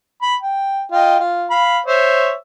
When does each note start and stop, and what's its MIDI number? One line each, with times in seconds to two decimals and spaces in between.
0.22 0.35 83
0.42 0.82 79
0.92 1.17 65
0.92 1.17 75
0.92 1.17 79
1.20 1.48 65
1.51 1.79 77
1.51 1.79 83
1.86 2.34 72
1.86 2.34 73
1.86 2.34 76